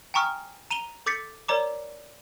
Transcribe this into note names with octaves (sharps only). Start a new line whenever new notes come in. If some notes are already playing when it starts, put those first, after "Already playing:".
G5 G#5 A#5 C#6 D#6 F6
A#5 D#7 F7 G7
A4 D6 G6 A6 B6 C#7
A#4 C#5 D5 A#5 D6